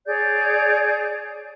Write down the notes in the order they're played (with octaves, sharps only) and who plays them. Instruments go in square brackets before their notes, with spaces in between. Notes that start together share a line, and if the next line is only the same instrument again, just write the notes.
[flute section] G#4 C#5 D5 G6